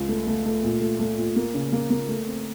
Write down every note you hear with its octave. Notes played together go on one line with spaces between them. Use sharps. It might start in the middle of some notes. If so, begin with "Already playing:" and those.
Already playing: C#2
A3
A3
A3
A#2
A3
A3
A#2
A#3
C#3
A#3
A#3
A3
C4